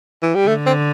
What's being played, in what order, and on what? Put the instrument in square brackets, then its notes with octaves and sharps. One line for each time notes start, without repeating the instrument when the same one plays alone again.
[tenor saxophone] E3
G3
[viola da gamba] D3 [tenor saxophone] A3
[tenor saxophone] C4